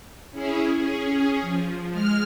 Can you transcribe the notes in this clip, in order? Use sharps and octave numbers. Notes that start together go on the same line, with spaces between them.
C#4 E4 G#4
C#4 G#4
F3
G#3 F6